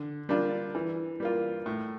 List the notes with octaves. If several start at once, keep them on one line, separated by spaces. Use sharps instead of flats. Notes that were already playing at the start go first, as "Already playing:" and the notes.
Already playing: D3
G3 A#3 D4 F4
E3
G3 A#3 F4
A2